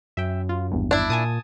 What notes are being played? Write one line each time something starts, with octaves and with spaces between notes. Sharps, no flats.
F#2 E5 G5
F4
G#1 E2 G2
D4 E4
A#2 G#5 A5 D#6